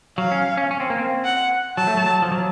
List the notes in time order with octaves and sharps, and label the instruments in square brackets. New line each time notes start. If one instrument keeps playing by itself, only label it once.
[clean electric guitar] F#3 [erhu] F5
[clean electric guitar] C#4
C#4
C#4
C4
A#3
C4
[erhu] F#5
[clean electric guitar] F#3 [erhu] A5
[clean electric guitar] A3
F#3
F3
F#3